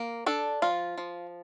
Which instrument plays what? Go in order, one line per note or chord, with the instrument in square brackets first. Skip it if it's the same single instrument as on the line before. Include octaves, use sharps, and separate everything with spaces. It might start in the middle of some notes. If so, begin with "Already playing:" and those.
Already playing: [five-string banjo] A#3
D4 A4
F3 F4
F3